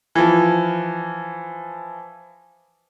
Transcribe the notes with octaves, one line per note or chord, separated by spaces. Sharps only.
E3 F3